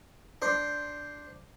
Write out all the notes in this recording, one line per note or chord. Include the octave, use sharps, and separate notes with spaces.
D4 C5